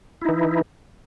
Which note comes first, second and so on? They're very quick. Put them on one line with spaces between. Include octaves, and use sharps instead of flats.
E4 D#4 E3